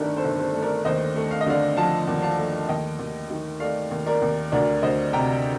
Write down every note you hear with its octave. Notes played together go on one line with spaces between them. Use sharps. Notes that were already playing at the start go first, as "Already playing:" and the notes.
Already playing: G1 G2 D#3 A3 A4 A#4 D5
A4 C5
G1
A4 C5
A3
A#4 D5
D#2 C5 D#5
A3
F5
D#5
D3 D5 F5
F3 F5 A5
D#2
F5 A5
A3
D#2 D#5 G5
D#2
D#3
A3 D5 F5
D#2
A#4 D5
D#2
D2 A#4 D5
D2 C5 D#5
C3 G5 A#5